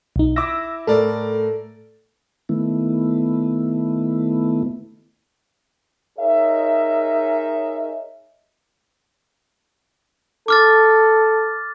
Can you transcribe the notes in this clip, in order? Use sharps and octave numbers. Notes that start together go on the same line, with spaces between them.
B1 D#4
E4 D6 E6 A#6
A2 A4 A#4 D5
D#3 A3 B3 E4
D#4 G#4 A#4 C#5 D#5 E5
A4 D6 F6 A6